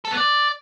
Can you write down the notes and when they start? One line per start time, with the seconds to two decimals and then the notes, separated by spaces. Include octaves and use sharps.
0.05 A4
0.11 B3
0.17 D5